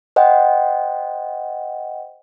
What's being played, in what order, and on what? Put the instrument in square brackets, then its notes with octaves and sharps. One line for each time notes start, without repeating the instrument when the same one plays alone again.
[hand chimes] C5 D#5 F#5 G5